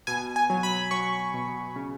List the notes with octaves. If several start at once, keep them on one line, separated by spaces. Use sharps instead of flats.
B2 G#5
G#5
F#3
B5
F#3 C#6
B2
C#3